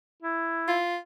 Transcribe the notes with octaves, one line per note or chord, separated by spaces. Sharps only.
E4
F4